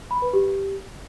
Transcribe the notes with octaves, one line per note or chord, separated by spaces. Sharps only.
B5
B4
G4